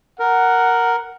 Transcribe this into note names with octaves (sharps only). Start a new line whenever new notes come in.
A#4 F#5